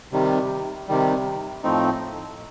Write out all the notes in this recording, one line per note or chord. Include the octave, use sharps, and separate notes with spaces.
C3 D#3 G3
C3 D#3 G3
A2 F3 A3 C4 D#4